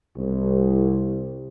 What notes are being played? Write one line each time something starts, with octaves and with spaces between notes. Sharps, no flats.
C2